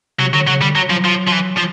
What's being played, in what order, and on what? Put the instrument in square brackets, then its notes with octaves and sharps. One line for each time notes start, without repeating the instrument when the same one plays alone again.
[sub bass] C3 [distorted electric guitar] F#3
[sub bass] D3 [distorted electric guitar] F#3
[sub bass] C#3 [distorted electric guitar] F#3
[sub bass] D3 [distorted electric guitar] G3
[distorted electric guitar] F#3
[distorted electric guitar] F3 [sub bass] F#3
[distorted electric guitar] F3
F3
E3
F3